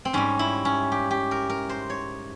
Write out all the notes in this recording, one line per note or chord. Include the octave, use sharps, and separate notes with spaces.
C4
G#2 G3 C#4
E4
C#4
G4
G4
A#4
A#4
C5
C#5